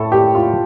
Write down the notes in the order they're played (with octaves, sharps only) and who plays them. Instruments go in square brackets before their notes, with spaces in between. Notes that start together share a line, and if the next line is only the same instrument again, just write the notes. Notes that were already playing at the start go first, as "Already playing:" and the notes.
Already playing: [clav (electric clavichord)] A2 [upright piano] A4
[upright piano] G4
F4